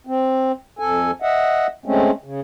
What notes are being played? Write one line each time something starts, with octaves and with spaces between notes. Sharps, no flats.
C4
F2 A4 G#5
D#5 E5 F#5
G#3 A3 C4 C#4
C#3